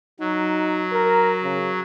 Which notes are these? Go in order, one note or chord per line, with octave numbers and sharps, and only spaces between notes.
F#3 D#4
A#4
C#3